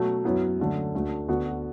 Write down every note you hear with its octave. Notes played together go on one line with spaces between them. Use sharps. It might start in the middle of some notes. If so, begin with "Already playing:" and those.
Already playing: B2 F#3 A3 F#4
F#2 F#3 B3 E4
F#2 D3 A3
D2 D3 A3
D2 D3 B3 F#4